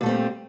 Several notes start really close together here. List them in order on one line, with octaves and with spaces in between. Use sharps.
A#2 A3 G3 C4